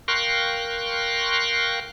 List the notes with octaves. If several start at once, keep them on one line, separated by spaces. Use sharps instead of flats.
A#4 F5 G5 C6 C#6 F#6